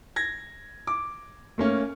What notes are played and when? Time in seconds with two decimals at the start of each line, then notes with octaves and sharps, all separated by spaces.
0.16 G#6 A#6
0.87 D6
1.58 A3 A#3 C#4